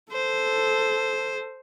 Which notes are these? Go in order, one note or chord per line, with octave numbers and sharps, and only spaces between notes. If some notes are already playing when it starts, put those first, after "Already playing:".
A4 C5